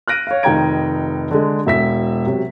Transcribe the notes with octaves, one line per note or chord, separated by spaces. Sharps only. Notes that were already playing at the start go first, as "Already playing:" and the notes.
F6 F#6 A#6 D7 D#7
C#5 F5
F1 D#3 G5 A#5 G#6 D7
D3 G#3
E1 E5 B6
C3 F#3